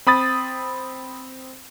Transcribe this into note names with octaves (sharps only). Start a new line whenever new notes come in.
C4 B5 D#6 A6